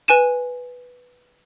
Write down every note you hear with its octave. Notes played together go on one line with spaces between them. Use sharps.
B4 G#5 D#7 E7